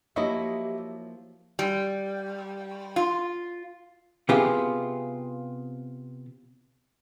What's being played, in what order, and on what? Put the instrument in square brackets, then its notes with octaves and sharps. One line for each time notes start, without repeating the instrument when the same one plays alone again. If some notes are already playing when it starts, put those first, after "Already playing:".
[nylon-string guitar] F3 A#3 F4 [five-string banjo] F#3 E4 D#5 [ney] G4 [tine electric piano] E5
[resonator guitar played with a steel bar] G3
F4
[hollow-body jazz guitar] C3 B3 F4 G4 G#4